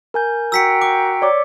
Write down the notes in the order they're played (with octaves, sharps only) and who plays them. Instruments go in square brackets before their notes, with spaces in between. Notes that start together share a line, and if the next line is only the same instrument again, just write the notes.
[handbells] A#4 G#5 G6
[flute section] F#4 G5 A#5 [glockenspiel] E6 B6 C#7
[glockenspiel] D6
[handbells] C#5 D5 D6